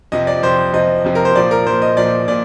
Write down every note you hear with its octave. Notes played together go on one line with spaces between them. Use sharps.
F2 C3 F3 D#5
D5
F2 C3 F3 C5
F2 C3 F3 D#5
F2 C3 F3
A#4
C5
A#2 F3 D5
A#4
A#2 F3 C5
D#5
A#2 F3 D5
A#2 D5